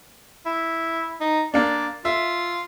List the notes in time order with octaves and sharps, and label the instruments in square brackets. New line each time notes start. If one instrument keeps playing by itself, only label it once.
[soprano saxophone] E4
D#4
[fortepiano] A#3 D4 [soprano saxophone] D5
[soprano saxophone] F4 [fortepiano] E5